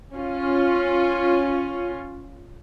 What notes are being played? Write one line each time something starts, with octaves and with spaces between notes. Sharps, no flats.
C#4 F4